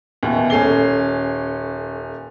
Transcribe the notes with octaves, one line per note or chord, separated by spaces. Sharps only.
D#2 B2 E3
D#1 C#4 A4 C7 G7